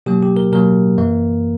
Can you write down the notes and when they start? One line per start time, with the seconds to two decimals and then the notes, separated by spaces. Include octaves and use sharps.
0.06 B2 F#3 A#3 G4
0.23 G4
0.37 A#4
0.53 B2 F#3 A#3 A#4
0.98 F#2 E3 A#3